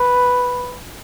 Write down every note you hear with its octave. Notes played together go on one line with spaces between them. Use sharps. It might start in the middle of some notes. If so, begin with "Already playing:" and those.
Already playing: B4